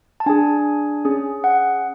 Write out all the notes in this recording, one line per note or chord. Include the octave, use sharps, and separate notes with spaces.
A5
D4 G#4 G#5
C#4 G#4
F#5